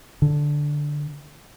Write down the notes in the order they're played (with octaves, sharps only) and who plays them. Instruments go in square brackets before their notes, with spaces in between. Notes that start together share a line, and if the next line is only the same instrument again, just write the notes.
[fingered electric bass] D3